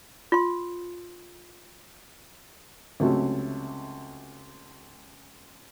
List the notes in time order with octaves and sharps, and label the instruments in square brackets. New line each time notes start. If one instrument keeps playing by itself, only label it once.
[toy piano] F4 C6
[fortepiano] C#2 C3 F#3 A3 C#4